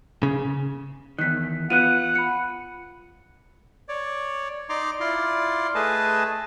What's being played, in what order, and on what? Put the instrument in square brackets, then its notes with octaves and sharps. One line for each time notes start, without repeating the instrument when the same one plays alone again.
[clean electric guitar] C#3
[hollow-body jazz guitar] E2 G2 D#3 [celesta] F#6 B6
[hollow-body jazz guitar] B3 F4 [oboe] F#5 [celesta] F#6 D#7
[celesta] B5 C#7
[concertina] C#5 D5
D#4 D5 A#5 C6 D6
E4 F4 D5 C6
A3 G#4 B4 D#5 G#5 A5